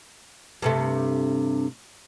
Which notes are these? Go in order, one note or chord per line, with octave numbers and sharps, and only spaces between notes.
G2 C3 A3